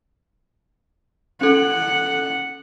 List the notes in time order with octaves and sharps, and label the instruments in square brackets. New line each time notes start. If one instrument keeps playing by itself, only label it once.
[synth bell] C#4 A4 [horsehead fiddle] F#5